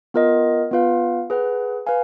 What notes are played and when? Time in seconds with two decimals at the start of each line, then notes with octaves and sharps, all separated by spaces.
0.14 B3 F4 A#4 D#5
0.71 B3 F4 B4 F5
1.30 G#4 B4 F#5
1.87 B4 F5 G#5